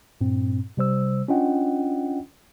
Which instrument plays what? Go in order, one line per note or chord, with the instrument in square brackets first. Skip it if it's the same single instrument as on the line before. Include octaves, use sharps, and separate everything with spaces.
[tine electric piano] G2 A#2 C4
C3 G3 C5 E6
C#4 D4 F4 D#5 F#5 G5